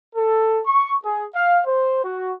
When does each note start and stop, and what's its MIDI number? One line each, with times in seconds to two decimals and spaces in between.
0.16 0.60 69
0.66 0.94 85
1.04 1.25 68
1.34 1.60 77
1.65 2.04 72
2.04 2.31 66